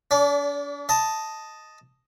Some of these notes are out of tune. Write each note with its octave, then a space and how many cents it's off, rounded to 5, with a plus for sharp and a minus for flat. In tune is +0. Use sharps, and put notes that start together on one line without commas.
D4 -45 D5 -20
D#5 +0 A5 +0